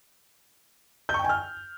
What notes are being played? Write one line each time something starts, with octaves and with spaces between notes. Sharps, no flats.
G6
C#6
G5
G#5
F6